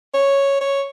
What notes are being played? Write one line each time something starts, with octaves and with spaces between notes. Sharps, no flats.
C#5
C#5